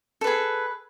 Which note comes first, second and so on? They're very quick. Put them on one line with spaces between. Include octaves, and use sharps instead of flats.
A4 B4 G#4